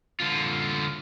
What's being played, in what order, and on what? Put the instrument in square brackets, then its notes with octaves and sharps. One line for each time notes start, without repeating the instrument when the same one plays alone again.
[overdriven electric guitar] D3 F4